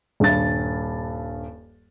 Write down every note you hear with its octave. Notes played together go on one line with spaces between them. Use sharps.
D#1 G2 A6